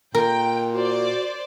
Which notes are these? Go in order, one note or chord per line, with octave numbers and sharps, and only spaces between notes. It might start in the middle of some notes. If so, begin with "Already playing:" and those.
A#2 A#4 G5
F#4 C5 D5